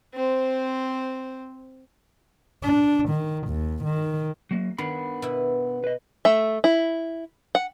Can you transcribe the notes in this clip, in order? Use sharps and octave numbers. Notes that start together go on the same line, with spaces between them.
C4 C5
D4
D#3
D#2
D#3
F#3 A#3
D#3 B3 D4 B5
B2 E4
B4 D#5
A3 E5
E4
F#5